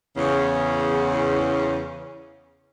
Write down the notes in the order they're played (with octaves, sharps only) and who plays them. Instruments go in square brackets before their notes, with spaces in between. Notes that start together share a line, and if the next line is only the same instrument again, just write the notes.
[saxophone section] E2 C#3